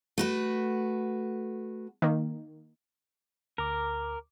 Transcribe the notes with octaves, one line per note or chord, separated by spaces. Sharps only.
A3 F#4 B4
D#3 A#3
D2 A#4 D6